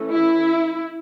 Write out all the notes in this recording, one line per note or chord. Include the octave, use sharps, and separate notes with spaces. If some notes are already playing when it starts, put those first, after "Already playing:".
Already playing: E3 A3 C#4
E4